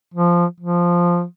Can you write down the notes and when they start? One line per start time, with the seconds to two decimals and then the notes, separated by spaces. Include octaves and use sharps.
0.14 F3
0.60 F3